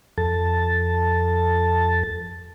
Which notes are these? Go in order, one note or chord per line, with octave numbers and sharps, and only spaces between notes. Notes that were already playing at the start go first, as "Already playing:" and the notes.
F2 A4 A5